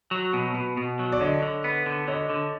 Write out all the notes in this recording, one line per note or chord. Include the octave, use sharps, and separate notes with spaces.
F#3
B2
B2
B2
F#3
D5
D3 C#5 D#5
D3
B3
D3
D3 C#5 D#5
D3